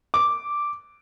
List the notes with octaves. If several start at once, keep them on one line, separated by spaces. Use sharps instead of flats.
D6